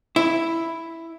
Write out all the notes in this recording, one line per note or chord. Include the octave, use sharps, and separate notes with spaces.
E4